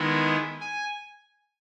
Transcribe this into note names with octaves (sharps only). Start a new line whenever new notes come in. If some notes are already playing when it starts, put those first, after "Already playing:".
Already playing: D#3 G#3 B3 E4
G#5